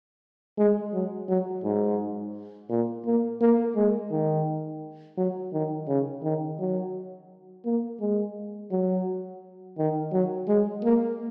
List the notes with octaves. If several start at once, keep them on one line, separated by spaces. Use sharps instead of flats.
G#3
F#3
F#3
G#2
A#2
A#3
A#3
G#3
D#3
F#3
D#3
C#3
D#3
F#3
A#3
G#3
F#3
D#3
F#3
G#3
A#3